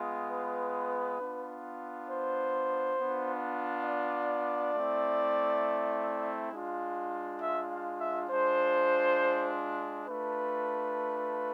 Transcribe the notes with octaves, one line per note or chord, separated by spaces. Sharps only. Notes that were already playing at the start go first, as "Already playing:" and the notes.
Already playing: G#3 B3 F4
B4
B3 D4 F4
C5
B3 D4 F4
D5
A3 C4 E4
G#3 D4 F4
E5
F5
E5
G#3 D4 F4 C5
A3 D4 F4 B4